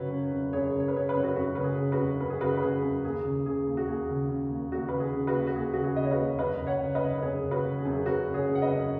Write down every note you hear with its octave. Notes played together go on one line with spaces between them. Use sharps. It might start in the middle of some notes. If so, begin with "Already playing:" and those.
Already playing: F#2 C#3 F#4 B4 C#5
C#3
F#2
F#2 G#4 C#5
C#3
C#5
B4
C#3 G#4 C#5
B4
F#2 C#5
F#4 B4
F#2 F#4
C#3 B4
G#4
C#3
F#4 B4
F#2
F#2 B4
G#4
C#3 F#4 B4
B4
C#3 G#4
F#2
D#2 G#4
C#3
C#3 G#4
D#2
F#4
D#2 G#4
C#3
C#3
D#2
D#2 F#4
C#3 B4
G#4
C#3
F#4 B4
D#2
F#4
D#2 G#4
C#3 F#4
G#4
C#3 D#5
C#5
F#4 B4
D#2
F#2 B4 D#5
C#3
C#5 F#5
C#3
B4 D#5
F#2
B4
F#2 G#4 C#5
C#3
F#4 B4
C#3
G#4
F#2
G#4
F#2 F#4 B4
C#3
G#4 C#5
C#3
F#5
B4 D#5
F#2